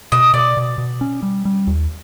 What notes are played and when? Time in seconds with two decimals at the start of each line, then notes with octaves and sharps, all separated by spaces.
0.12 B2 D#5
0.33 B2 D5
0.57 B2
0.78 B2
1.01 C#4
1.22 G3
1.45 G3
1.67 D#2